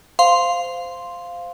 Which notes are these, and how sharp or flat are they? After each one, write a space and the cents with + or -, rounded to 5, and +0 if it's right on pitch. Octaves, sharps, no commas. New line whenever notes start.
C5 -15 F5 +0 C6 +0